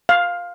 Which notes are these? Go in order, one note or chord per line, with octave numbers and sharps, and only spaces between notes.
F5